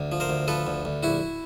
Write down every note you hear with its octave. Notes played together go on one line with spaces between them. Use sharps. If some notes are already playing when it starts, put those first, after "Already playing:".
Already playing: D2
F3
A#4 C5
D2
F3 A4 B4
D2
D2
A#1 E4 F#4